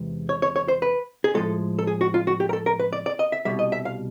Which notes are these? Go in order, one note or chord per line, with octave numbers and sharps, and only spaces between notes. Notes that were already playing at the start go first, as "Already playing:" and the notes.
Already playing: E2 C3 E3 G#3
C#5
C#5
C#5
C5
B4
G#4
A2 F3 G#3 A4
A4
G#4
F#4
F4
F#4
G4
A#4
A4
A#4
B4
D5
D5
D#5
E5
C2 B2 G3 E5
D#5
E5
F5